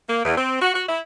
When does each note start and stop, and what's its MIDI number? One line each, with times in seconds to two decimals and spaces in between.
0.08 0.23 58
0.24 0.34 40
0.37 0.60 60
0.61 0.73 66
0.74 0.83 66
0.88 0.98 64